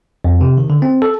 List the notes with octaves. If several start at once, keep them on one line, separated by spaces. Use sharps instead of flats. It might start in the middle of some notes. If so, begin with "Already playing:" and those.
F2
C3
D#3
D3
C4
A4